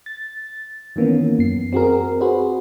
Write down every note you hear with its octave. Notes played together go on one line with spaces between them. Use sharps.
A6
D#3 E3 A#3 B3 C#4
F#2 C7
C4 F#4 G#4 A#4
F#4 G#4 B4 C5